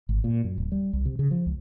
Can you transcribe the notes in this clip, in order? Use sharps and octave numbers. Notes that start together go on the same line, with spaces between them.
G#1
A#2
F#2
D1
G3
C2
C3
C#3
F3
C#2